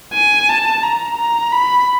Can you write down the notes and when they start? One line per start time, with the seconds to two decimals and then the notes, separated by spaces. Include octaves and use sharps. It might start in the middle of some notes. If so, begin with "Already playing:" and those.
0.14 G#5
0.49 A5
0.83 A#5
1.18 A#5
1.52 B5